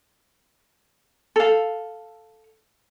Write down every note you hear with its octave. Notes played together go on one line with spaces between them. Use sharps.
A4 F5